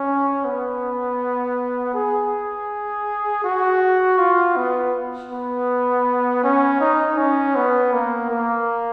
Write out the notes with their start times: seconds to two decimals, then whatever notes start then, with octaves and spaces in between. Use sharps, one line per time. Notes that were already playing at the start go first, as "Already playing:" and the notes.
Already playing: C#4
0.45 B3
1.94 G#4
3.44 F#4
4.19 F4
4.56 B3
5.31 B3
6.44 C#4
6.80 D#4
7.18 C#4
7.55 B3
7.93 A#3
8.30 A#3